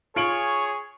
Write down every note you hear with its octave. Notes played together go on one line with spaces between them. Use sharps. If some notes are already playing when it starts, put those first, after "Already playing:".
F4 G#4 C#5 C#6 D7 F#7